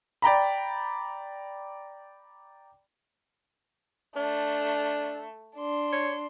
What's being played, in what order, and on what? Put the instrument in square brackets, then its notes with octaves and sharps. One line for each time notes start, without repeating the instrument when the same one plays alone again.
[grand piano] D5 G5 A#5 B5
[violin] A3 [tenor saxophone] D4
[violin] D4 C6
[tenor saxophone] C#5